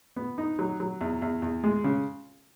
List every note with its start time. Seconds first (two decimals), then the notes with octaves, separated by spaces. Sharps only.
0.16 B3
0.38 D#4
0.59 F#3
0.80 F#3
1.01 E2
1.22 E2
1.42 E2
1.64 G#3
1.84 C#3